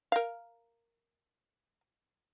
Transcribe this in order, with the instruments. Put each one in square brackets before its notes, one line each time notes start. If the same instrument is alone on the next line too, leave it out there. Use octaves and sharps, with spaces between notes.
[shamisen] A#4 F5